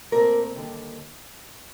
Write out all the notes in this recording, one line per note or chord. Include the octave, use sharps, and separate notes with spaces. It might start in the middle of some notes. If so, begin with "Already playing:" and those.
A#2 A3 C4 A#4 D5
D#2 D3 G3 D4